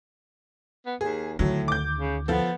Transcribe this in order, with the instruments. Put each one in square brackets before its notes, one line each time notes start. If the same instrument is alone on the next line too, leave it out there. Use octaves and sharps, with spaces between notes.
[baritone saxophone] B3
[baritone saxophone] D#2 [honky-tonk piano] G#4
[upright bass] D2 D#3 [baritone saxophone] A2 [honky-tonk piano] F#3
[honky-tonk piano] D6 G6
[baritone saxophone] C#3
[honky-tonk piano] F3 A4 [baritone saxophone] B3